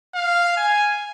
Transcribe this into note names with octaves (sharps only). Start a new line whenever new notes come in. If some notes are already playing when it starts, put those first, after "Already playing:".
F5
G#5